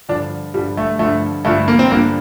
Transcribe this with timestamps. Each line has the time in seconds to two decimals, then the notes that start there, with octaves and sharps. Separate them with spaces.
0.09 G2 D3 F3 D4
0.54 G2 D3 F3 G3
0.77 A3
0.99 F3 A3
1.02 G2 D3
1.45 G2 D3 F3 A3
1.68 A#3
1.79 C4
1.90 G2 D3 F3 A#3